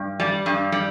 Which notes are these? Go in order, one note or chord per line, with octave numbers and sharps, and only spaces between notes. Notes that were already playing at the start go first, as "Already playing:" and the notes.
Already playing: G2
G3
G2
G3